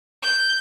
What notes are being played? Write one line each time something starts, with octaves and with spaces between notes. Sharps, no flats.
G6